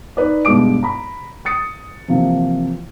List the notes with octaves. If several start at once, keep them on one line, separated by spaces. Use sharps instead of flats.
D#4 B4 D5
G2 B2 G#3 E4 D6 D7
A#5 B5
D#6 A6 C#7
C3 E3 F3 A#3